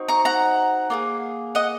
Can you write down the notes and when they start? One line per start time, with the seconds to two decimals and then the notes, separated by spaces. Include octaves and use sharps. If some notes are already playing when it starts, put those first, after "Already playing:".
Already playing: C4 D#4 F#4
0.08 A#5 C#6
0.25 F#5 A#5
0.90 A#3 F4 G#4
1.55 D#5 F#5